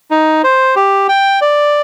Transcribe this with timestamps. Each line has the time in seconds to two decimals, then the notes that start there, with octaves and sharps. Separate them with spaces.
0.11 D#4
0.44 C5
0.76 G4
1.09 G5
1.41 D5